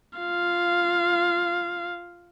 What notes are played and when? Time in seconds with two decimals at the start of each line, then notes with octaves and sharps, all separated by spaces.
0.19 F4 F5